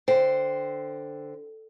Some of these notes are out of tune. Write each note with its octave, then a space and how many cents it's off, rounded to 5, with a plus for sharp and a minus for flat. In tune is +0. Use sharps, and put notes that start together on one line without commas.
D3 +0 C5 +0 G5 -5